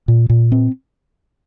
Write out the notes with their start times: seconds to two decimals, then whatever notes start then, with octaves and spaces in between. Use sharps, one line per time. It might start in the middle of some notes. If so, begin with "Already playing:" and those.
0.08 A#2
0.30 A#2
0.52 C4